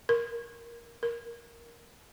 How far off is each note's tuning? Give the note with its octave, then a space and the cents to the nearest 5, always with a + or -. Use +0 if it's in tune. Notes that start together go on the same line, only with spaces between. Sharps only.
A#4 +10
A#4 +10